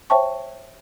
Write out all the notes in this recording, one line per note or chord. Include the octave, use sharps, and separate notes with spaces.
C5 C#5 E5 G5 A5 C#6